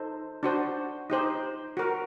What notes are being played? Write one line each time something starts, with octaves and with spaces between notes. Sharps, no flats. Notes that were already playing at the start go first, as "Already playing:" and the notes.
Already playing: D#4 A4 C5
D4 F#4 C5
D#4 G4 C5
F#4 A#4